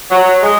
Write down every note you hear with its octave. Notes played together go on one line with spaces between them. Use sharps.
F#3
G#3